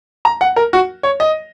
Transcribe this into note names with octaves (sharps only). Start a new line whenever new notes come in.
A#5
F#5
A#4
F#4
C#5
D#5